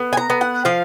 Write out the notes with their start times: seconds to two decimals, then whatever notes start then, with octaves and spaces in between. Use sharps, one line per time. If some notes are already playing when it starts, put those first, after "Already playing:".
Already playing: B3
0.13 G#5
0.17 A#5
0.30 B3
0.41 F#5
0.65 F3 F5